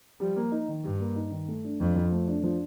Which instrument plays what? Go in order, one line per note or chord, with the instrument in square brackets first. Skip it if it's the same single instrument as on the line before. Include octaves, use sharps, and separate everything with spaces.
[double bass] F3 [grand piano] G3
[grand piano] A#3
D#4
D#3
[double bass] G2 [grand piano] G3
[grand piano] A#3
D#4
D#3
A3
D4
[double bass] F2 [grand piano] F3
[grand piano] F3
A3
D4
F3